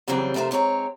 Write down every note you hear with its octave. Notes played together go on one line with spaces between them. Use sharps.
F2 C#3 E3 F#3 G3 C4
F2 C3 A3 A#4 C5
G#2 C4 G#4 C#5 A#5